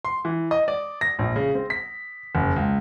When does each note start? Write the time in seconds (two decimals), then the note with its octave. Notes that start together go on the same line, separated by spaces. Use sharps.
0.05 C6
0.25 E3
0.51 D#5
0.68 D5
1.01 A#6
1.19 A#1
1.36 C#3
1.55 C4
1.70 B6
2.35 F#1
2.56 C#2